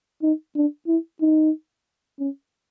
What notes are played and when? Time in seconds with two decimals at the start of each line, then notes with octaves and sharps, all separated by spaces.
0.23 D#4
0.56 D4
0.87 E4
1.21 D#4
2.19 C#4